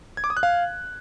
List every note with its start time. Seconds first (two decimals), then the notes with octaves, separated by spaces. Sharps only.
0.17 G#6
0.24 D6
0.30 D#6
0.37 F#6
0.43 F5